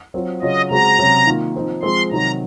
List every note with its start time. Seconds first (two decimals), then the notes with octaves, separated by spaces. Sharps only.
0.14 F#3 C4 F4
0.42 C#3 F#3 C#4 F4 D#5
0.70 C#3 G#3 C4 F#4 A#5
0.98 C3 F#3 C#4 F#4
1.27 D#3 A#3 F4
1.56 F3 C4 D#4
1.83 F3 G#3 C4 C6
2.12 C3 D#3 F#3 A#5